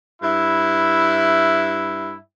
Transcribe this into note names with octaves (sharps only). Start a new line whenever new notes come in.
G2 E4